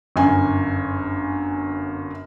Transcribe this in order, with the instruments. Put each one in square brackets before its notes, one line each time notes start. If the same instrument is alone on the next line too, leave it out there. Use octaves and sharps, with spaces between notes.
[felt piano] G1 F#2 G#5